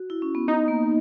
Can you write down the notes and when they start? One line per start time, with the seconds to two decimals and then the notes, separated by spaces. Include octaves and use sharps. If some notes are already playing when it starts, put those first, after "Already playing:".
Already playing: F#4
0.10 E4
0.22 C#4
0.35 B3
0.48 B3 D#4
0.68 A#3